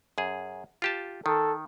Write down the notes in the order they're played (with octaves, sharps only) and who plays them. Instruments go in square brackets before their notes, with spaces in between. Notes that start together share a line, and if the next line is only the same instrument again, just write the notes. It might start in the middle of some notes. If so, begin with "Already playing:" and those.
[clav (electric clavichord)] F#2 G#4
F4 G4 A5
[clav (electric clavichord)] D#3 [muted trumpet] A4